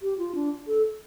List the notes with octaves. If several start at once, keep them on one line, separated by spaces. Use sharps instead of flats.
G4
F4
D4
A4